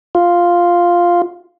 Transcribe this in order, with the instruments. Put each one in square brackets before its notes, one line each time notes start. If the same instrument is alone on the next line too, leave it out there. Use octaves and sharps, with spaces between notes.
[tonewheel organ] F4